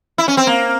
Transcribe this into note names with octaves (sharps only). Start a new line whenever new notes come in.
E4
C#4
C4
A#3